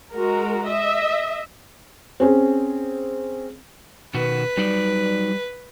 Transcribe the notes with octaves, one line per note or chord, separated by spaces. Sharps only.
G#3 F#4 A#4
D#5 E5
C4 C#4 G#4
B2 D#3 F#4 B4
F#3 G3 D#4 D5